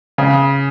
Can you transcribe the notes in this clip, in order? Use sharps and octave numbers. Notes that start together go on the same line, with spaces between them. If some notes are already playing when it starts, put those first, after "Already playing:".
C#3